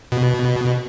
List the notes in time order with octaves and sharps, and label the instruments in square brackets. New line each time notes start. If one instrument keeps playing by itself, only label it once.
[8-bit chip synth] B2